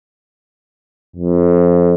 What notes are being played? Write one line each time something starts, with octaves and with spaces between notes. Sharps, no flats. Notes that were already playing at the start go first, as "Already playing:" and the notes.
F2